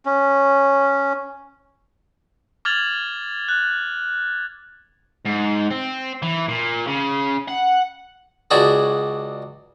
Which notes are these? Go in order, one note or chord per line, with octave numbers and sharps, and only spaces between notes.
C#4
D6 F6 G#6 A6 F7 F#7
F#6
G#2
C4
E3
A#2
C#3
F#5
C#2 D4 F#4 G#4